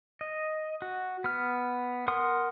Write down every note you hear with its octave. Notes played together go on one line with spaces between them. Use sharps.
D#5
F#4
B3 F6
A#4 F#5 C6 D#6